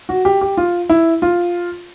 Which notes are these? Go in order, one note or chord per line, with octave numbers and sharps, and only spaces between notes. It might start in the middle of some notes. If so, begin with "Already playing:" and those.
F#4
G4
G4
F4
E4
F4